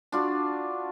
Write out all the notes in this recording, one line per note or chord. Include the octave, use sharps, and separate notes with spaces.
D4 F4 F#4